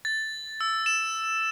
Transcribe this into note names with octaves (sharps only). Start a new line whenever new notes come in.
A6
E6
E7